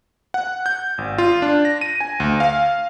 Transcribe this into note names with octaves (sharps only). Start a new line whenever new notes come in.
F#5
G6
G#1
F4
D4
A#6
D#7
G#5
D2
F5